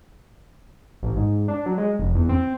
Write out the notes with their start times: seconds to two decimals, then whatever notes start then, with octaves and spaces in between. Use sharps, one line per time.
1.03 A1
1.16 G#2
1.48 D4
1.66 F#3
1.78 G#3
1.99 F1
2.15 E2
2.29 C4